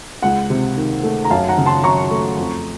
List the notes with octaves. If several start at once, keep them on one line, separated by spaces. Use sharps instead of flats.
C#2 F#5
C3
D#3
A3
A#5
F#2 F5 A5
F#5 A#5
C#3
A5 C6
F#3 A#5 C#6
A3
F2